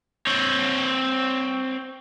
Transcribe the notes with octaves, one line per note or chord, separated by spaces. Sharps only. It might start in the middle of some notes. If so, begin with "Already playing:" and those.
C4 C#5